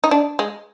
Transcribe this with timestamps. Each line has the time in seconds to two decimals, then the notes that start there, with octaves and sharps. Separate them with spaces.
0.04 D#4
0.11 D4
0.39 G#3